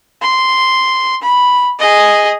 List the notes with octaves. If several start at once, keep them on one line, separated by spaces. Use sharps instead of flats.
C6
B5
G#4 D#5